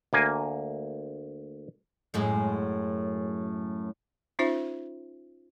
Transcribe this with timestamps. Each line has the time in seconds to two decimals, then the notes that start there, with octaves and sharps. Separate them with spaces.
0.13 D2 A#3 G#5
2.14 F#2 A2 G#3
4.39 C#4 D#4 F4 C5 E5